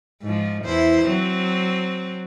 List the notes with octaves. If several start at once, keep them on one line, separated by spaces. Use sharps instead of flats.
G#2 F3
E2 E4 C5
F#3 C4